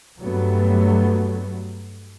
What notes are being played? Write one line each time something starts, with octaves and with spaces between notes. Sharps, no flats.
G2 F#3 G3 A3 B3